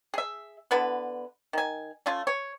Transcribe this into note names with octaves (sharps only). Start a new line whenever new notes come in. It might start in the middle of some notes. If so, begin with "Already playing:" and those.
G#4 E5
D3 B3 E4 B4
D#3 G#5
A3 C#4 F4
C#5